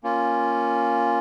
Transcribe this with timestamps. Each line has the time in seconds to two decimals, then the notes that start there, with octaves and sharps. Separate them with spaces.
0.03 A#3 C#4 F4